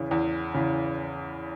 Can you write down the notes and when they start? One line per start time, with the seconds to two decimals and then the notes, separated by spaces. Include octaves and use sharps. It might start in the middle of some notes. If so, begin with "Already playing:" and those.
Already playing: E2 C#3 E3
0.11 E2
0.54 C#3 E3